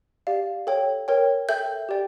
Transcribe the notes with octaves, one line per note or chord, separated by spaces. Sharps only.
G4 D5 F5
A4 C#5 G5
A#4 C#5 G5
A4 E5 G5 G6
G4 D5 G5